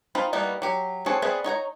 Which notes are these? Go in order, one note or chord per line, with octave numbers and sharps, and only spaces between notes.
C4 D#4 F4 B5
G3 A#3 B3 D#4 E4
F#3 G4
C4 F#4 G#4 A4 C#5
B3 C4 G#4 D5 E5
D#4 C#5 G5 A#5